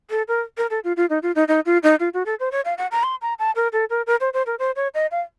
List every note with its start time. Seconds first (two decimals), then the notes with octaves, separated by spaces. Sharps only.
0.10 A4
0.28 A#4
0.57 A#4
0.70 A4
0.84 F4
0.97 F4
1.10 D#4
1.23 F4
1.35 D#4
1.48 D#4
1.66 F4
1.83 D#4
2.00 F4
2.14 F#4
2.26 A4
2.40 C5
2.52 C#5
2.65 F5
2.78 F#5
2.91 A#5
3.03 C6
3.22 A#5
3.39 A5
3.56 A#4
3.73 A4
3.90 A#4
4.07 A#4
4.20 C5
4.33 C5
4.46 A#4
4.59 C5
4.76 C#5
4.94 D#5
5.11 F5